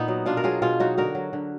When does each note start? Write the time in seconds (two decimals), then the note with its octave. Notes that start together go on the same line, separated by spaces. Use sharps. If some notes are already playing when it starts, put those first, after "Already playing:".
Already playing: A#2 B3 D#4
0.08 F#3
0.26 B2 D4 F4
0.37 A#4
0.44 F#3 F4 G#4
0.62 B2 F4 G#4
0.80 F#3 D#4 F#4
0.97 D3 F#4 A#4
1.15 F#3
1.33 D3